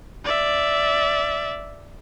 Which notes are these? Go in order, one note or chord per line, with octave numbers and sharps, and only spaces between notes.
D5 E5